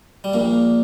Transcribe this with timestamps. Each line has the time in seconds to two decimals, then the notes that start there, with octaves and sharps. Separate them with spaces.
0.24 G3
0.34 A#1 A#2 A#3